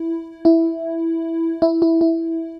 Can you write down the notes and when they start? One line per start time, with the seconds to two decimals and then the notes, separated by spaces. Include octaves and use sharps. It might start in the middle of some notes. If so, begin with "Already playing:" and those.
Already playing: E4
0.45 E4
1.62 E4
1.82 E4
2.01 E4